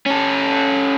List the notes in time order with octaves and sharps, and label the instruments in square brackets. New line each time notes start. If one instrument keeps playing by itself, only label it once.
[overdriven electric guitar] C#4 A4